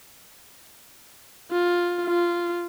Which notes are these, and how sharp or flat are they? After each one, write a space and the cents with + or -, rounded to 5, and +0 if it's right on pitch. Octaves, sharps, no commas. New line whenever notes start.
F4 +10
F4 -10